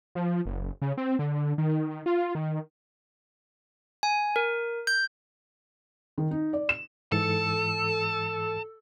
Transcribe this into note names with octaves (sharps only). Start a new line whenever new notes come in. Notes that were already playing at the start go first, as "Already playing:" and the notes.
F3
F#1
C#3
C4
D3
D#3
F4
D#3
G#5
A#4
G6
D#3
D#4
D5
E7
G#2 E3 A4 A5